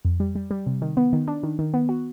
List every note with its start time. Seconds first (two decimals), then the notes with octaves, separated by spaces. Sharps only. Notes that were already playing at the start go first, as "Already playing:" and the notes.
0.05 F2
0.20 G3
0.35 G3
0.51 G3
0.66 C3
0.82 D#3
0.97 B3
1.13 D#3
1.28 D4
1.43 D#3
1.59 D#3
1.74 B3
1.89 F#4